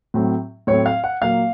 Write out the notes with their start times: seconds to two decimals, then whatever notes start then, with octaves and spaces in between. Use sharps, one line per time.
0.14 A2 F#3 A3 C4
0.67 A2 F#3 A3 C4 C#5
0.86 F5
1.04 F#5
1.21 A#2 F#3 A#3 F5